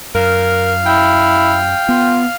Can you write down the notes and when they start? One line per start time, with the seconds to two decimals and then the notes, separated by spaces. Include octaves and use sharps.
0.15 F#2 A#4 F5
0.86 E4 G5
1.89 B3 F4